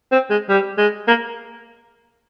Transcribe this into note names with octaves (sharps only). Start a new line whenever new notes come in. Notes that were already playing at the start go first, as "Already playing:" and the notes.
C4
G#3
G3
G#3
A#3